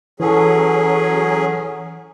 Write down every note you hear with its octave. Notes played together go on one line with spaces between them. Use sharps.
E3 F#3 C#4 G#4 A4